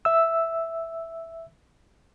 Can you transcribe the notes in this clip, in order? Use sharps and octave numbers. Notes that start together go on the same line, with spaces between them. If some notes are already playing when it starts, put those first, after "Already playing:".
E5 E6